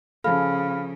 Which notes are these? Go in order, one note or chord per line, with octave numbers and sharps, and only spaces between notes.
C#3 F3 G#4 A4 F5 B5 F6